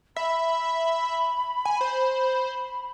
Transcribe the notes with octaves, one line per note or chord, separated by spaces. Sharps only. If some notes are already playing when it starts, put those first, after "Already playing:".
E5 B5
G#5
C5